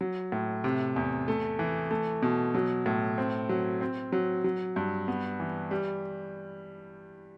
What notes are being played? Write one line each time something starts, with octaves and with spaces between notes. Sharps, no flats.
F#3
A2
C3
E2
A3
E3
A3
B2
F#3
A2
C4
F#3
C4
F#3
F#3
G2
B3
E3
G3